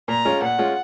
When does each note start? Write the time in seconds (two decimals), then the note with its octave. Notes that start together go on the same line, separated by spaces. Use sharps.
0.08 A#2 A#5
0.25 G#3 C#4 F4
0.42 A#2 F#5
0.58 G#3 C#4 F4